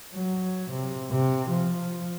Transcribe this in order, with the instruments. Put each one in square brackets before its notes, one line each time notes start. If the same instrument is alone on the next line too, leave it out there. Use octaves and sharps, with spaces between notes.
[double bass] F#3
C3
C3
F3